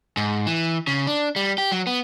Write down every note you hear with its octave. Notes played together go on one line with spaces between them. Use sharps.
G#2
E3
C#3
D4
G3
G4
F#3
B3